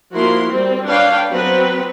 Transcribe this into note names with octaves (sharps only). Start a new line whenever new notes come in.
F3 A#3 E4 F#4 A#4 C6
G3 C4
D4 B4 C#5 F5 G5
F#3 B3 C4 B4